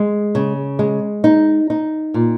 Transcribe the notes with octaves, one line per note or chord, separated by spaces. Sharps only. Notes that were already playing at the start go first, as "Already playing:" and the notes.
Already playing: G#3
C#3
G#3
D#4
D#4
A#2